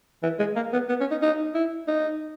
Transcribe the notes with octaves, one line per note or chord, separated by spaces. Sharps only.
E3
G#3
A#3
B3
B3
C#4
D#4
D#4
E4
D#4